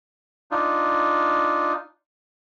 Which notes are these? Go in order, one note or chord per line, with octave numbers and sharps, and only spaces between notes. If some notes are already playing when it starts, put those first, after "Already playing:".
D4 D#4 F4